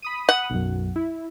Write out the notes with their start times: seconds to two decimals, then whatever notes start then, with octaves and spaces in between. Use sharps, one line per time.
0.02 B5 D#6 D#7
0.29 F#5
0.50 B1 F#2
0.96 E4